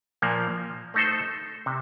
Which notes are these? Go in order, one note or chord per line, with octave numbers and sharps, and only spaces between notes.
A#2 F3 A#3
A3 D#4 A4 C5
C3